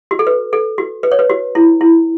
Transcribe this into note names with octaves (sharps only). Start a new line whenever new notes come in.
F#4
A4
B4
A4
F#4
B4
C#5
B4
F#4
E4
E4